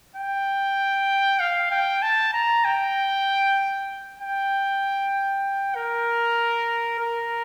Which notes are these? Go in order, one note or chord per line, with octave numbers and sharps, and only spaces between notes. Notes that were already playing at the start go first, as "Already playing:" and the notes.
G5
F5
G5
A5
A#5
G5
G5
A#4
A#4